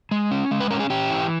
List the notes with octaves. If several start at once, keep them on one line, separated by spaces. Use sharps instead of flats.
G#3
C#4
G#3
B4
C#4 A#4
G#4
C#4 G4
E3